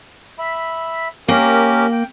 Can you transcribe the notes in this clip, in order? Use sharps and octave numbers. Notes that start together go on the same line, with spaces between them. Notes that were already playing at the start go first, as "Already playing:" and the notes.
E5 B5
A#3 C#4 G4 A#4
G5